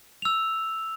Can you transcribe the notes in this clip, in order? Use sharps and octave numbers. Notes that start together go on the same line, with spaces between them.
E6 F7